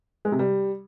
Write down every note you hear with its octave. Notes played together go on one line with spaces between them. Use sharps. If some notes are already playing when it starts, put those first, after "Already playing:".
G#3
C3
G3